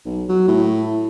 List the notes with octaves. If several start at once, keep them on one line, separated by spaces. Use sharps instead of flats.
B1
F#3
A2